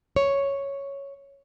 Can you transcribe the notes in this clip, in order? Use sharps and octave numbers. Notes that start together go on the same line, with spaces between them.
C#5